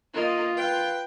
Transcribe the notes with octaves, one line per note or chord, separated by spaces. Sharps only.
A#3 F4 D#5
B4 F5 G5